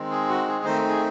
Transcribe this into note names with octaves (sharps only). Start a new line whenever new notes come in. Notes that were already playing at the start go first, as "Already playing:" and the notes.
Already playing: D#3 G#3 C4
G#4
F#4
G#4
D#3 A3 C4 D#4 C5
G#4